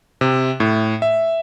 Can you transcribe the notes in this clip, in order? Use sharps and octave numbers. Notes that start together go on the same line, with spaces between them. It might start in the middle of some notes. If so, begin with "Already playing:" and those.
C3
A2
E5